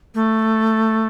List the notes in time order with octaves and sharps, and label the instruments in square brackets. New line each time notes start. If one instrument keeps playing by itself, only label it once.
[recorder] A3